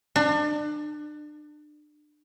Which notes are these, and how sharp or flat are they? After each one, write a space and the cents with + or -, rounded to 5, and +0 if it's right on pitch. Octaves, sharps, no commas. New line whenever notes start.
D4 +30